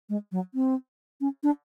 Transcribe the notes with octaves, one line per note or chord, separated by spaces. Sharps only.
G#3
F#3
C4
C#4
D4